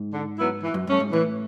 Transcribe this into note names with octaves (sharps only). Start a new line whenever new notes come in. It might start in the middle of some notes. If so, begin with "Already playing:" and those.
Already playing: G#2
D3
F#3 B3 E4
E3
F#2
G2 A3 C#4
G#2
A2 E3